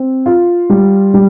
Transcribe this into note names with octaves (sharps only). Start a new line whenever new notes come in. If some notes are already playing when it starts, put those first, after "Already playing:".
Already playing: C4
F4
G3
G3